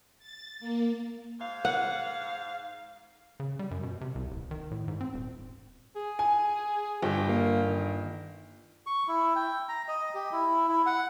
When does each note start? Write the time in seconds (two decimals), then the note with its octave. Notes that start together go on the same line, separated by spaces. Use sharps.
0.19 A6
0.60 A#3
1.40 G#2 F5
1.65 F#5
3.40 C#3
3.59 G3
3.71 F#2
3.83 B2
4.01 C3
4.15 C2
4.30 D1
4.51 D#3
4.71 A2
4.88 G#2
5.01 C4
5.14 D#1
5.96 G#4
6.19 G#5
7.03 G1 G4
7.28 A#3
7.67 D#3
8.86 C#6
9.08 E4
9.36 G5
9.69 A#5
9.88 D#5
10.15 G4
10.32 E4
10.68 E4
10.86 F#5